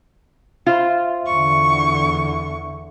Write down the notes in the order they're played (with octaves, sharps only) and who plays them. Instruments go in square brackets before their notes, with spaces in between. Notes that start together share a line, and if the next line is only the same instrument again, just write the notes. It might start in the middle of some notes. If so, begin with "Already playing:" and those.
[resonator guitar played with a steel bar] F4 C5 [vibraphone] E5
[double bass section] E2 D3 [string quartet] C#6